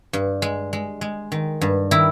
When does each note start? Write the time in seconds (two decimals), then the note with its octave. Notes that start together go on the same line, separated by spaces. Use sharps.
0.13 G2
0.42 G#3
0.73 G#3
1.01 G#3
1.32 D#3
1.61 G2
1.91 D#3 E4